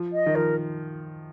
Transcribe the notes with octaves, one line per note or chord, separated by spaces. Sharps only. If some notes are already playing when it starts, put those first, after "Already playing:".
Already playing: F3
D#5
D#3
F3 A#4